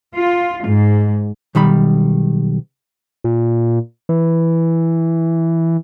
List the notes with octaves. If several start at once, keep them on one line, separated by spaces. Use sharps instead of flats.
F4
G#2
B1 D#3 G3 B5
A#2
E3